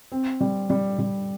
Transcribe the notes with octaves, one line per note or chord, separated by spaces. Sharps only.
C4
G3
G3
G3